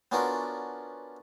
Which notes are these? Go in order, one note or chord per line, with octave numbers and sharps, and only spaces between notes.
B3 C#4 D4 F4 F#4 A#4